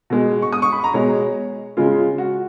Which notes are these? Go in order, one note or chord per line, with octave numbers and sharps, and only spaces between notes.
B2 G#3
C#6
D#6
C#6
B5
A#5
B2 G#3 C#5
C#3 G#3 F4
F#4